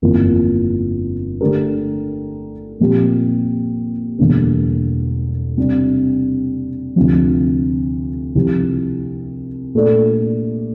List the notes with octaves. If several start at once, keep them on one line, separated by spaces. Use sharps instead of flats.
G1 F2 E3 A#3 F4
D3 A3 D4 G4 A#4
A#2 F3 C4 G4
E1 E2 D3 G3 A#3
C3 G3 D4
D2 C3 F3
C2 C3 F3
A#2 A3 D4 A4 D5